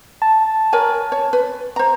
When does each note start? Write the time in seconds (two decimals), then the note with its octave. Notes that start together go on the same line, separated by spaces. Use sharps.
0.22 A5
0.73 A#4 C#5 G#5
1.12 C#5
1.33 B4
1.76 C5 A#5